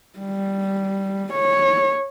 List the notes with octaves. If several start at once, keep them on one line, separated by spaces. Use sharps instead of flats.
G3
C#5